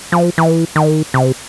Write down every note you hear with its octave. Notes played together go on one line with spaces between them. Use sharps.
F3
E3
D#3
C3